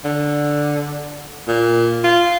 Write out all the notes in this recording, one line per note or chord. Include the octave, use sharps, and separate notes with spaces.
D3
A#2
F4